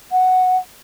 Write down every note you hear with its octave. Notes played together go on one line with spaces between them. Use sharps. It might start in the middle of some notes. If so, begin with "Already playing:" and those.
F#5